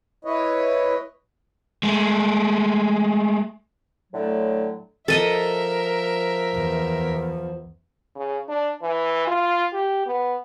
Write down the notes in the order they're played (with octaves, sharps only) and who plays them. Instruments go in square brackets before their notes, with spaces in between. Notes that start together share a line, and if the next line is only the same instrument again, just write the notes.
[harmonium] E4 B4 C#5 D#5
[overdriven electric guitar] G#3 A3
[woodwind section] A2 D3 F#3 A3
[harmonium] F3 [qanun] A4 D#5 [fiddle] A#4 E5
[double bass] E2
[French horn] C#3
D4
E3
F4
G4
B3